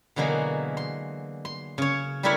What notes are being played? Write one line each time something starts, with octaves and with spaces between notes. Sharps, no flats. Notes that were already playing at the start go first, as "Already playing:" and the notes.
B2 D3 E3 F#3 G#3 A#3
C6
C6
C#3 C#5
G3 A3 D4 E4 A#4 C#5